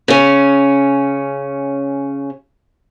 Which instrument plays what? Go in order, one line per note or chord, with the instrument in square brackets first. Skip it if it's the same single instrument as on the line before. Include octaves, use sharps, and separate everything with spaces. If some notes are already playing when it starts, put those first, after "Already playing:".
[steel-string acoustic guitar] C#3 C#4